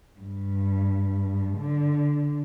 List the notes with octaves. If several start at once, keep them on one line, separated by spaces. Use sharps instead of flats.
G2
D3